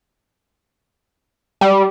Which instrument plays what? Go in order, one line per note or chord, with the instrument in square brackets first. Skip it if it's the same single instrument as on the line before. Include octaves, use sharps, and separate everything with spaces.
[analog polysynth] G3